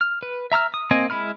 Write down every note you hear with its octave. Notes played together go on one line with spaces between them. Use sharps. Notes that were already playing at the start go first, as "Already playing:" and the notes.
F6
B4
E5 A#5 E6 F6
D#6
A#3 C4 D#5 G#5
G#3 E4 B5 F6